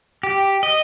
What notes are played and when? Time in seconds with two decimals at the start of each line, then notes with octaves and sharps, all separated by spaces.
0.23 G4
0.63 D#5